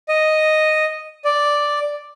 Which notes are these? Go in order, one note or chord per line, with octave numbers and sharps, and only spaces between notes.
D#5
D5